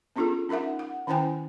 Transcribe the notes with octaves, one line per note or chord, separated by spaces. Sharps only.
B3 C#4 D4 F4 G#4 A4
C#4 D#4 A#4 E5 F#5
F#5
D#3 C#4 E4 C5 G5 G#5